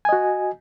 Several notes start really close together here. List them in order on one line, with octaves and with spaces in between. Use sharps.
G#5 D#5 F#4